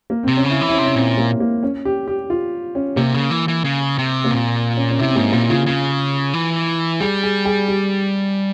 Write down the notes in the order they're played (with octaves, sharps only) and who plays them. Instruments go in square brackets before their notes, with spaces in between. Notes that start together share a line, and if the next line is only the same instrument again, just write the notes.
[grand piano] A#3
[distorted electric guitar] C3 [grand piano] C4
[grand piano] C#4
[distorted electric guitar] C#3
[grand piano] E4
[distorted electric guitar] E3
[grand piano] E4
C#4
[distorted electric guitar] C3
[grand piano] C#4
[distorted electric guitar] A#2 [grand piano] C4
[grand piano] A#3
A#3
C#4
G4
G4
F4
C#4
[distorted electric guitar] C3 [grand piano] A#3
[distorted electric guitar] C#3
E3
E3
C#3
C3
[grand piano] A#3
[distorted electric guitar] A#2 [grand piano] C4
[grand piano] C#4
C#4
[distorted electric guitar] C3 [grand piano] E4
[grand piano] C4
[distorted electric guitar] G#2 [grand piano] A#3
[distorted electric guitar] A#2 [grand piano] A#3
[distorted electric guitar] C#3 [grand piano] F4
[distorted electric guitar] C#3
E3
[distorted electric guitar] G3 [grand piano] G#4
[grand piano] G#4
G#4
G4